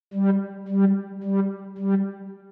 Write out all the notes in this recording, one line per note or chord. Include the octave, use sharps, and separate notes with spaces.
G3
G3
G3
G3